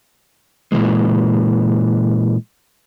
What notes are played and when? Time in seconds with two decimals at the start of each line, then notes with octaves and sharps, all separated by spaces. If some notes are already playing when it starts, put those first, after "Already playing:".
0.72 A#2 C#3 E3 G#3